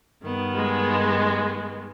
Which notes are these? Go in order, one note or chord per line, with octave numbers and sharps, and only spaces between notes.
G2 D#3 B3
G#3